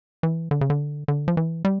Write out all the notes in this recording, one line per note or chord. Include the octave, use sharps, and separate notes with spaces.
E3
D3
C#3
D3
D3
F3
E3
G3